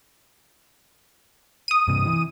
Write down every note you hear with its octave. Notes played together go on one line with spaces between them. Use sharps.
D#6 D#7
G2 C3
E3